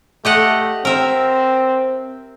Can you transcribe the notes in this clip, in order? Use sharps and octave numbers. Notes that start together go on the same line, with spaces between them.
A3 G4 D#5 F#5
C4 A#4 E5